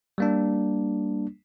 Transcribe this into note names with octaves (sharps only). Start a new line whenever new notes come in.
G3 A#3 D4